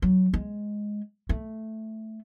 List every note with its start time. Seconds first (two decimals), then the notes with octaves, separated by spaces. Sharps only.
0.02 F#3
0.34 G#3
1.29 A3